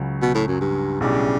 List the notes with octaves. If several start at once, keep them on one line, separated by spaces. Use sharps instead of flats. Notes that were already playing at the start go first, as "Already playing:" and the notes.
Already playing: C#2 C#3 F#3
B2
A2
F#2
G2
B1 A2 C#3 G3 D4